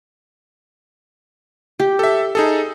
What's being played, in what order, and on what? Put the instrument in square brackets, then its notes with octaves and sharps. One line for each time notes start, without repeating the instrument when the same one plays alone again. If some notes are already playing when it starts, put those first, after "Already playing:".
[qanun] G4
[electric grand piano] A4 E5
D#4 G#4 A4